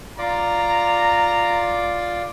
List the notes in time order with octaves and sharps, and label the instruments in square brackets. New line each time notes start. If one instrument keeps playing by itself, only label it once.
[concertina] F4 D5 [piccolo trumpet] A#5